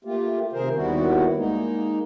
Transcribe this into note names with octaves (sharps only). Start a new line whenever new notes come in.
A3 A#3 F4 G4
C3 D#3 G#4 A#4 C5
D#2 D#3 G3 B3 E4 F#4
G#3 A#3 D#4